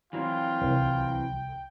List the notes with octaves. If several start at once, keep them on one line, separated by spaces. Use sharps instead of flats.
E3 F#3 C4 F4 G5
C2